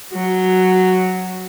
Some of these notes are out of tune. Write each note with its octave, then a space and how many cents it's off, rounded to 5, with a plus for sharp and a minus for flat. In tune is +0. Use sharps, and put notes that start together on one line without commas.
F#3 +0 F#4 +0